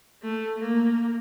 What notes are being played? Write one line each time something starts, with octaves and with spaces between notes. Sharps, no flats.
A3
A#3